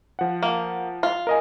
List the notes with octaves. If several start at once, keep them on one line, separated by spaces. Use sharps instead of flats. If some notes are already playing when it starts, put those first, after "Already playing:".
F3 F#5
A#3
F4
A#4 D#5 G#5